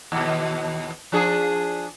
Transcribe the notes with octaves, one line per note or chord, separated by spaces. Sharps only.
D#2 B2
F3 D4 G#4